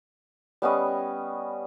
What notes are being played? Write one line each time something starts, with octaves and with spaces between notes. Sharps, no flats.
G3 B3 C#4 D#5